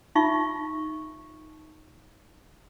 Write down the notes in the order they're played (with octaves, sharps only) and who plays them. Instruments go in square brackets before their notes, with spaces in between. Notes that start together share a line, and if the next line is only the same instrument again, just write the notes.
[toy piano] D#4 F4 E5 C#6